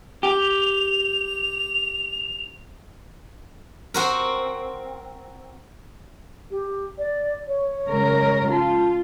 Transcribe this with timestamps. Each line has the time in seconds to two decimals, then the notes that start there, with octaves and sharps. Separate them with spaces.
0.23 G4 F7
3.94 C4 F#4 A#4
6.51 G4
6.98 D5
7.48 C#5
7.88 C#3 G#3 A#4
8.50 F4 A5